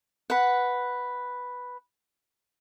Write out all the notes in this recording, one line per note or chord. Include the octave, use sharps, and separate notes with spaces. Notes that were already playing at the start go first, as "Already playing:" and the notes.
B4 F#5